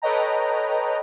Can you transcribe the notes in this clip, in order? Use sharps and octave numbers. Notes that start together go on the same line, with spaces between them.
A4 B4 C#5 D#5 G5 A#5